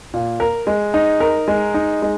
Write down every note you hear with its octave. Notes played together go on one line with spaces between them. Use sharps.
A#2
A#4
G#3
D#4
A#4
G#3
D#4
G#3